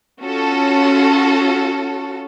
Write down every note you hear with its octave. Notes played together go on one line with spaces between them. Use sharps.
C#4 F4 F#4 A4